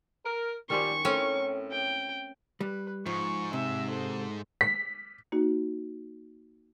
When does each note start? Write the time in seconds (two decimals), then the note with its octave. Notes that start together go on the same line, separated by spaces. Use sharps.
0.24 A#4
0.70 A#2 D#3 G3 C#4 C5 C#6
1.05 A2 A3 C4 C#4 A#4
1.72 G5
2.61 G3 B4
3.06 G#2 F3 C#6
3.53 C3 E5
3.87 A4 C5
4.61 B6
5.32 A#3 D#4 F#4